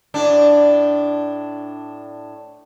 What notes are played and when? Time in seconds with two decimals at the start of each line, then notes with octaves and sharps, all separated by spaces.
0.14 A2 D4